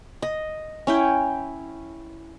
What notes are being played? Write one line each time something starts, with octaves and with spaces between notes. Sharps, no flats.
D#5
C#4 E4 G5